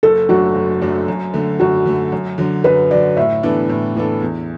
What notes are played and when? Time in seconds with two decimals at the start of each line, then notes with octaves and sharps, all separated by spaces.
0.03 F#1 A4
0.29 F#2 F#3 A3 D4 F#4
0.55 F#1
0.82 F#2 F#3 A3 D4
1.08 F#2
1.34 D3 A3
1.59 F#2 F#4
1.86 D3 A3
2.12 F#2
2.38 D3 F#3
2.64 F#2 B4
2.91 D3 F#3 D5
3.17 A2 E5
3.43 E3 B3 D4 A4
3.69 A2
3.96 E3 B3 D4 A4
4.22 E2